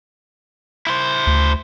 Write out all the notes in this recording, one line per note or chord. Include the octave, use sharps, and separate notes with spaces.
E4 C5
D2